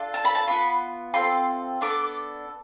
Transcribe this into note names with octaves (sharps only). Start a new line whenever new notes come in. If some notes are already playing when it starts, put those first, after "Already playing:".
Already playing: D4 F4 A4
A5
B5
A5
B3 D4 F4 B5
C4 F4 A4 C6
B3 D4 A4 D6